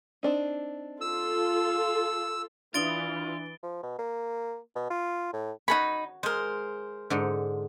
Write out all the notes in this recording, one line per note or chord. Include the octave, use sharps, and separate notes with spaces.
C4 D4 D#4
F4 A4 E6
E3 D4 F4 D#6 A6 D7 G7
F3
B2
A#3
B2
F4
A2
D#4 F#4 A4 C#5 B5
G#3 A#4 C5
G#2 D3